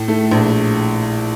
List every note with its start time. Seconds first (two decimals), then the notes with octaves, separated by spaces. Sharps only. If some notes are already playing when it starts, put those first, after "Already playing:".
Already playing: A2
0.08 A3
0.31 A#1